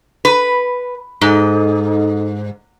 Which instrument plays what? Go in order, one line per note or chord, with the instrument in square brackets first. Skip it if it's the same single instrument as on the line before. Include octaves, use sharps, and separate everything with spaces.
[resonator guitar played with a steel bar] B4
[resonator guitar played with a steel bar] G#2 [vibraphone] D#4 A4 D#5